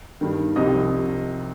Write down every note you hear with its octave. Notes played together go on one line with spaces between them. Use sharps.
G2 D#3
C2 C3 F3 D#5